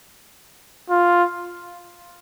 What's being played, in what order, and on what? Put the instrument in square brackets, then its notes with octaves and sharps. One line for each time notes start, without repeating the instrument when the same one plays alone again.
[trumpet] F4